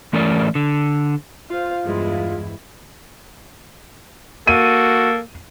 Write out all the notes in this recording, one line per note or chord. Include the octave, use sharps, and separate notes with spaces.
E3 A3 C#4 A#4 D5
D3
F4 C5 F5
E2 G2 G#3 E4
A#3 F#4 A4 D#7